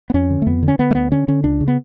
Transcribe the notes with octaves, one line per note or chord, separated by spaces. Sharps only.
B3
F2 C#4
D3
A3
F2 B3
D3
C#4
D3 B3
A3
D2 B3
D3 C#4
D3 C#4
C#2 D4
C#3
B3